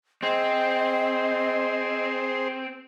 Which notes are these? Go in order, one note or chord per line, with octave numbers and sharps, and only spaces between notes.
C4 G#4 C5 D#5